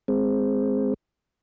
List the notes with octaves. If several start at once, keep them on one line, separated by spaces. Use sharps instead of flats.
G#3 C4